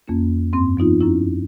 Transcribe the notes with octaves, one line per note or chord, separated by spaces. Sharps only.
F2 A#3 C#4
G2 C4 C6
F3 B3 D#4 F4
F#2 C#4 E4